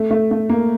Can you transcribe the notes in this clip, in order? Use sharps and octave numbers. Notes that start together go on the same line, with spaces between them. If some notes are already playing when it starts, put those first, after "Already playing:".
Already playing: A3
A3
A3
A#3